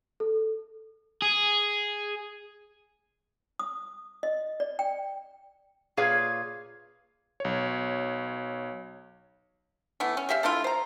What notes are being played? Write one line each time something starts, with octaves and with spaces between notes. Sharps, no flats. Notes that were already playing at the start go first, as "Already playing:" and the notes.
A4
G#4
D#6
D#5
D5
G5
A#2 G#4 B4 C#5 F5
B1 C#5
E3 A3 B3
C#4
G#3 G4 E5 F5
A3 D4 E4 F4
C5 A#5